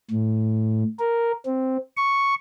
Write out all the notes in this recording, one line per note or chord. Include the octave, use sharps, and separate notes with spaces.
A2
A#4
C4
C#6